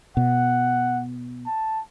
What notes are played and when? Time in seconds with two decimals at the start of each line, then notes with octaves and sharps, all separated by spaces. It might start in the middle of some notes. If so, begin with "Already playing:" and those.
0.17 B2 F#5
1.46 A5